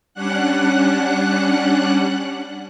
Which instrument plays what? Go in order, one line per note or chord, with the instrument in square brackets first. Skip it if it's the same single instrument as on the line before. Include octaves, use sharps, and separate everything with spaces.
[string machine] G3 C#4 D4 F#5 F#6